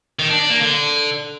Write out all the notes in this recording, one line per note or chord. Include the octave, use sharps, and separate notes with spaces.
D#3
D4
D4
A#3
D3